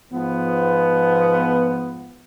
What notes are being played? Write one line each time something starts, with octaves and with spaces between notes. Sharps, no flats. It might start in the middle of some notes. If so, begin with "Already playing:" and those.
G#2 F3 B3